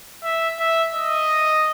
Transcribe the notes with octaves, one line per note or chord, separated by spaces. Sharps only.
E5
E5
D#5